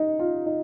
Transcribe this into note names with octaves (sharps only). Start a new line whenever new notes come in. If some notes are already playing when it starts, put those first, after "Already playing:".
Already playing: D#4
F4
D#4